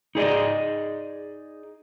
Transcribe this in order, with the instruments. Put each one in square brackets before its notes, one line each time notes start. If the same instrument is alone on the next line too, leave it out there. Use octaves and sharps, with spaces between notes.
[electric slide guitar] D#4 G#4 D5 D#5